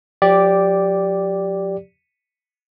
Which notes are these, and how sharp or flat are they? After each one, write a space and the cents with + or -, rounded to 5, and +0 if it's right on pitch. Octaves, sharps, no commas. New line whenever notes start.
F3 +45 G4 +0 D5 -5